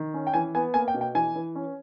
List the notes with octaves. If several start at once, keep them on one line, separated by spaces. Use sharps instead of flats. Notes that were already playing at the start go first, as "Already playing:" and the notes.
Already playing: D#3
C#4
G5
E3 G#5
B3 G#5
A#3 G#5
G5
B2
G5
E3 G#5
E3
C#4